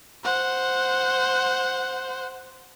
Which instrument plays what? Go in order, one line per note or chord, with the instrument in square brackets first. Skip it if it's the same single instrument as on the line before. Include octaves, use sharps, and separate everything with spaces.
[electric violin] C5 F#5